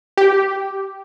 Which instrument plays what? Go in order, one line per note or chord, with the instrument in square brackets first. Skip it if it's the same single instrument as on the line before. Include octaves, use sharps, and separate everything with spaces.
[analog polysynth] G4